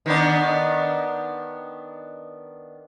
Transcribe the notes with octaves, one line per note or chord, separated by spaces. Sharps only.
D#3 B3 D4